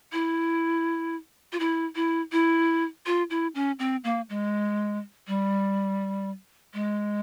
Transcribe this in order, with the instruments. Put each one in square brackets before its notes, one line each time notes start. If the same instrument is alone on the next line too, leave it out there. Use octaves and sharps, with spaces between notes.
[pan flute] E4
F4
E4
E4
E4
F4
E4
C#4
C4
A#3
G#3
G3
G#3